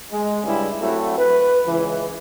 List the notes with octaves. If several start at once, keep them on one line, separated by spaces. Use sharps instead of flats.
G#3
G2 C#3 G3 G#3 E4
F#3 A3 C4 E4 F#4
B4
C#2 E3